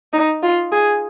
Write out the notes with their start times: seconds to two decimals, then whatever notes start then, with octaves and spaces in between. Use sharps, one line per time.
0.13 D#4
0.43 F4
0.72 G#4